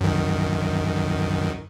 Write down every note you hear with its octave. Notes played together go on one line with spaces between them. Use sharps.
F#2 D#3